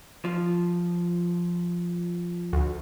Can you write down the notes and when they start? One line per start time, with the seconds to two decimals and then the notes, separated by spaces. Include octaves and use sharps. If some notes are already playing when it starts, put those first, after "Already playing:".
0.25 F3
2.53 D2